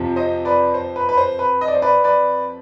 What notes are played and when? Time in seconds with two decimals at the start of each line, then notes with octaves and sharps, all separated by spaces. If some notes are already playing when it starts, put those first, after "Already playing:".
Already playing: F2 C3 F3
0.16 C5 D#5
0.45 B4 D5
0.74 C5
0.96 B4
1.09 B4
1.17 C5
1.39 B4
1.61 D#5
1.68 D5
1.75 C5
1.82 B4 D5
2.04 B4 D5